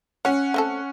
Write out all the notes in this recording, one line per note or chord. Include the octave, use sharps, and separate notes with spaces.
C#4 C#5 F#5
A3 C4 A4